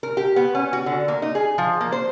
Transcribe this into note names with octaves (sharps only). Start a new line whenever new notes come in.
A#4
G4
B3
C#4
F#4
D3
A#3
D#4
G#4
F3
A#3
C5